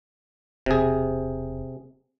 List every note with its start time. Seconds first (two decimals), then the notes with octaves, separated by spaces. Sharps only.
0.66 E1 C3 G#4